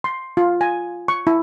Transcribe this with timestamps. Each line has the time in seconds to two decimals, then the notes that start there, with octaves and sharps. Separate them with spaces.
0.04 C6
0.37 F4
0.61 G#5
1.08 C#6
1.27 E4